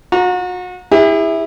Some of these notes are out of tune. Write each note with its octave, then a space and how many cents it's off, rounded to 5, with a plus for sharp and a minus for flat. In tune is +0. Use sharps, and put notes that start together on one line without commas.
F#4 -35 A#5 +0
E4 -10 G#4 -45